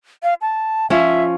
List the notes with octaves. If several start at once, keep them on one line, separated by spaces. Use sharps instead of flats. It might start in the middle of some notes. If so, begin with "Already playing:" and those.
F5
A5
F3 C#4 E5